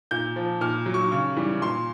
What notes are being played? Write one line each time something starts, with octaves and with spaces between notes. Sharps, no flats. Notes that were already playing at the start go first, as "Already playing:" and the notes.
A#2 G6
F3
A#2 F6
F#3
C#6
C#3 C#6
E3 G3
A#2 C6